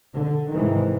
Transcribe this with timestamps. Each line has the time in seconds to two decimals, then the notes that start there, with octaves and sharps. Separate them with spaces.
0.14 D3
0.51 G#2 C3 D#3 E3